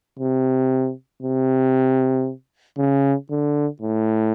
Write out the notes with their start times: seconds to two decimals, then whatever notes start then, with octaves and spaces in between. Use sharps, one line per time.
0.19 C3
1.23 C3
2.78 C#3
3.30 D3
3.82 A2